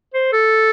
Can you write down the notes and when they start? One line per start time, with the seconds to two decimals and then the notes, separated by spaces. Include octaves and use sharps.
0.14 C5
0.33 A4